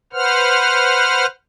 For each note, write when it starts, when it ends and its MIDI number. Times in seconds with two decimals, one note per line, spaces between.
0.13 1.26 71
0.13 1.26 72
0.13 1.26 78
0.13 1.26 89